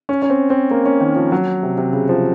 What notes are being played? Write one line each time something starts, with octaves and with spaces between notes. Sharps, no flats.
C#4
C#4
C4
C4
A#3
C#4
D#3
F3
F#3
C3
C3
C#3
F3